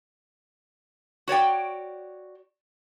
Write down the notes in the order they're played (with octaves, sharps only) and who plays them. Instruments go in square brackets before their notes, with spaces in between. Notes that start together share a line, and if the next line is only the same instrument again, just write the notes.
[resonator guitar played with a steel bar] F#4 C#5 D5 G5